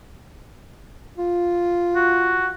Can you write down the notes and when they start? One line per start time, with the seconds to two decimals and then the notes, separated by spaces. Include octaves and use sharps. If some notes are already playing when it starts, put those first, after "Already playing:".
1.18 F4
1.95 F#4